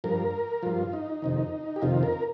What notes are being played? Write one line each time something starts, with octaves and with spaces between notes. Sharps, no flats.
G2 F3 A#4
G2 F3 F4
D#4
F2 C3 D#3
G4
F2 C3 D#3 F4
A#4